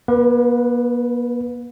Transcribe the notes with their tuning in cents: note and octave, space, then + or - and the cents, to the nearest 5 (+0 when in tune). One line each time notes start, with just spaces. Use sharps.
A#3 +45 B4 +0